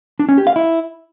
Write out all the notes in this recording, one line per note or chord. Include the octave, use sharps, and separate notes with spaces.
D4
C#4
G4
F5
E4